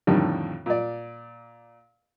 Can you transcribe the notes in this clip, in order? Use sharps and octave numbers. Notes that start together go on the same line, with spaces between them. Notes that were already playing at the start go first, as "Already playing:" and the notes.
F2 A2 D3 D#3 G3
A#2 D5